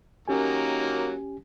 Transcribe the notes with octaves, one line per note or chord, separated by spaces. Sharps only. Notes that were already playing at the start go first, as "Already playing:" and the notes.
D#3 F#3 A#3 C#4 G4 G#5